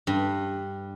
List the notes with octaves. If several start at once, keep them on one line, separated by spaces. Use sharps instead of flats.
G2